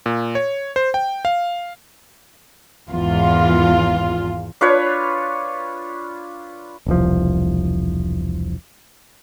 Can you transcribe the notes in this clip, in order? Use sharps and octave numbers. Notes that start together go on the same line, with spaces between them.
A#2
C#5
C5
G5
F5
G#1 E2 F4
D4 F4 B4 C#5
E1 C2 F3